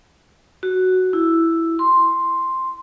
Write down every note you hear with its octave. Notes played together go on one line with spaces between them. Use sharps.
F#4
E4
C6